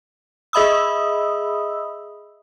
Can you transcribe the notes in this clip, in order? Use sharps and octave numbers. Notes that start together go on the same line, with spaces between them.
G#4 D#5 E5 B5 D#6 E6